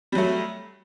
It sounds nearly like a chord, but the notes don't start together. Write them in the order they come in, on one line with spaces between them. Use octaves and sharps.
G3 F#3 A3